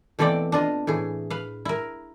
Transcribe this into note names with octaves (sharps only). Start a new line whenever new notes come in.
B2 E3 A3 C4 D5 G5
D4 F4 D#5
A2 E3 G#4
B4 F5
E4 A#4